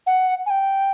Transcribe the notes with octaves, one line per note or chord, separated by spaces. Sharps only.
F#5
G#5
G5